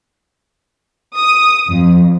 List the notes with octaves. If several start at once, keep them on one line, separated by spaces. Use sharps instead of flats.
D#6
F2